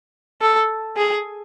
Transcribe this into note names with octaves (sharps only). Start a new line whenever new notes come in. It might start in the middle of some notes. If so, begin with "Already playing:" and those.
A4
G#4